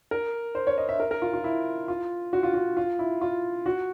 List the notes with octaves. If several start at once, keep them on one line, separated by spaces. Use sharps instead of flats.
A#4
C5
C#5
D#5
E5
A#4
A#4
F4
F4
E4
F4
F#4
F4
F#4
F4
E4
F4
F#4